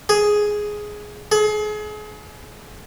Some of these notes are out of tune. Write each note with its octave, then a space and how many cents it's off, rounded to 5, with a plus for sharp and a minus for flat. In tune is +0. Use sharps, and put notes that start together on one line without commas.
G#4 +5
G#4 +35